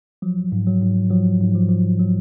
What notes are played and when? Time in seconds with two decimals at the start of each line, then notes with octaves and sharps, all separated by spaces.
0.22 F3 F#3
0.52 G#2
0.67 F#3
0.82 G#2
1.10 F3 F#3
1.40 G#2
1.55 F3
1.69 F3
1.99 F#3